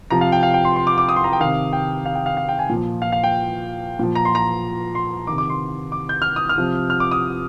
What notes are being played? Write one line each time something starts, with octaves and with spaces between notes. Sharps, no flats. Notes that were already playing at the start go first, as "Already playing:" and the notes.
C3 F3 A#5
F5
G5
F5
G5
C6
C6
D6
D6
D#6
C6
A#5
G5
C3 D#3 F5
G5
F5
G5
F5
F5
G5
G#5
A#2 F3
F5
F5
G5
A#2 F3
A#5
C6
A#5
C6
C3 D#3 D6
D6
C6
D6
G6
F6
D#6
F6
C3 F3
F6
D6
D#6